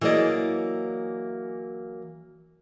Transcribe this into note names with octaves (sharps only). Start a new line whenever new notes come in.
E3 F#3 A#3 G#4 D5 D#5